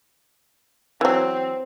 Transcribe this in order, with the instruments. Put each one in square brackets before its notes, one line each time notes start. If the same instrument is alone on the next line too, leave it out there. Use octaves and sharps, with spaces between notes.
[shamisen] E3 F#3 [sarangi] C4